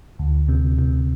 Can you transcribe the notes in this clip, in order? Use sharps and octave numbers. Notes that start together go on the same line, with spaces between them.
D2
C3
C3